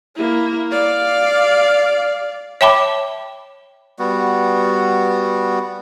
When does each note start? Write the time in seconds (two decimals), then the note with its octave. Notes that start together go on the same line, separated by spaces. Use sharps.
0.16 A#3 E4
0.71 D5 F5
2.61 C#5 E5 G5 A5 B5 D6
3.99 G3 B3 F#4